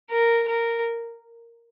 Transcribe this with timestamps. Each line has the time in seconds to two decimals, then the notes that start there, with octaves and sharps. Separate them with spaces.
0.11 A#4
0.48 A#4